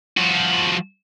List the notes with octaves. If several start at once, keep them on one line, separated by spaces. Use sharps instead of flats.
F3 F#4